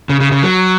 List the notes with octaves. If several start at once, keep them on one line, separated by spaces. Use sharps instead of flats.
C#3
C#3
C#3
F#3